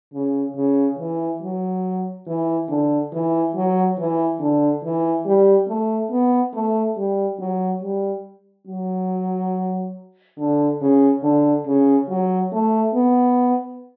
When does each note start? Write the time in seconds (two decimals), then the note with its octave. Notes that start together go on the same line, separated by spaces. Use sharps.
0.14 C#3
0.56 C#3
0.98 E3
1.42 F#3
2.27 E3
2.69 D3
3.13 E3
3.55 F#3
3.98 E3
4.40 D3
4.83 E3
5.26 G3
5.68 A3
6.11 B3
6.54 A3
6.97 G3
7.39 F#3
7.82 G3
8.67 F#3
10.39 D3
10.81 C#3
11.23 D3
11.67 C#3
12.09 F#3
12.52 A3
12.94 B3